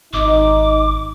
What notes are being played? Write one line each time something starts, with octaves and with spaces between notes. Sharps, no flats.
G#1 D#4 D6